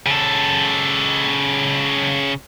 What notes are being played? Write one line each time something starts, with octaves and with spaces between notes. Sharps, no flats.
C#3 A4